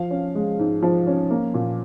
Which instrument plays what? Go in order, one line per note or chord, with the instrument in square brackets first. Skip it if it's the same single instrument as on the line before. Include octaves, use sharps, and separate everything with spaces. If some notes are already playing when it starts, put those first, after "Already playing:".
Already playing: [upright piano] F3 F5
C#4
G#3
G#2
F3
C#4
A#3
A#2